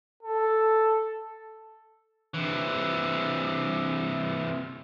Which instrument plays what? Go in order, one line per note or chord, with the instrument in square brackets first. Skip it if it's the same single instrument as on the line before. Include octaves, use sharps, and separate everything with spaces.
[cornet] A4
[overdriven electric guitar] C3 E3